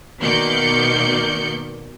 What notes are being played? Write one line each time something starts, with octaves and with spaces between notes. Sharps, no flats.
B2 D#3 A#3 D5 G6 C#7